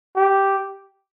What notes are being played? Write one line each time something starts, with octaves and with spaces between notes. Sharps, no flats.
G4